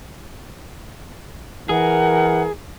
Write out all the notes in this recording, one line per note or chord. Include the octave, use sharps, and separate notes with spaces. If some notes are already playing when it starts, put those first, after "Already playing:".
E3 G#4 A#4 F#5